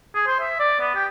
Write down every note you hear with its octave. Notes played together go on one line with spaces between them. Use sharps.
G#4
C5
E5
D5
B3
G4